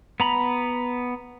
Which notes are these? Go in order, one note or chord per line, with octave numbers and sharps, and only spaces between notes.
B3 A#5 B5